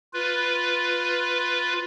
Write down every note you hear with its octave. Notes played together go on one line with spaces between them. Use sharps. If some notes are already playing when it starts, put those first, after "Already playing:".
F4 B4